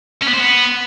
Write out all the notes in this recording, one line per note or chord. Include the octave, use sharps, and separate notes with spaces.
C#4
B3
C5
B3